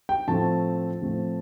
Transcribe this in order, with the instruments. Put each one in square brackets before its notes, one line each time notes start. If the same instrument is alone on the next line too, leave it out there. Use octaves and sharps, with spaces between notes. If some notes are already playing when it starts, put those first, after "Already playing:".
[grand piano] G5
A2 F3 A3 C4 A5
A2 F3 A3 C4